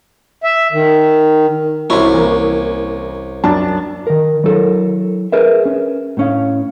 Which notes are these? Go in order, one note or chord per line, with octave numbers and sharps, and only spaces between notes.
E5
D#3
C2 C#4 E4 F#4
E3 A#3
F#2 D4 A5
D#3 A#4
F#3 E4 A4 A#4
G#4 A#4 B4 E5
C#4
A2 C#4 F5